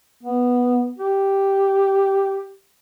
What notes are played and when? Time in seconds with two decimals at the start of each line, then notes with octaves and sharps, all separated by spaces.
0.23 B3
0.98 G4